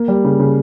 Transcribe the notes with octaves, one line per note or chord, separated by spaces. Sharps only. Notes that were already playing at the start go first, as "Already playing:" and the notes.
Already playing: A#3
G3
C#3
C#3